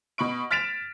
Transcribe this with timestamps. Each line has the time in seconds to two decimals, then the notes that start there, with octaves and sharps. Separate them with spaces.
0.18 B2 B5 C#6 D7
0.51 F6 A6 B6 D7 E7 F7